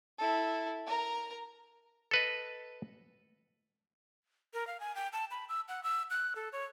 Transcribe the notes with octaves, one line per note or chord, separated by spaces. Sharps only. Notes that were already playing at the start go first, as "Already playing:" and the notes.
E4 A4
A#4 A#5
A4 B4 D#5
A#4
F5
G#5
G5
A5
B5
E6
F#5
E6
F#6
A4
C#5